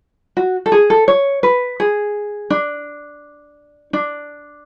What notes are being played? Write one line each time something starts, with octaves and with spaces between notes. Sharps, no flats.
F#4
A4
G#4
A4
C#5
B4
G#4
D4
D4